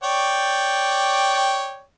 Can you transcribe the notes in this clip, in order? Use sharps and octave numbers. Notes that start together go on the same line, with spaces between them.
C#5 D5 G5